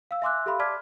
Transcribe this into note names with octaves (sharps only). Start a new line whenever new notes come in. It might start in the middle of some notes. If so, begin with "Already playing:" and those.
F5 E6
E5 G#5 C6 D6 E6 F#6
G4 A4 E5 F5 B5 C6
D5 A5 D6 F6 G#6 B6